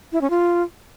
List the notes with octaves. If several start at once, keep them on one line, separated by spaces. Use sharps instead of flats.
E4
C#4
F4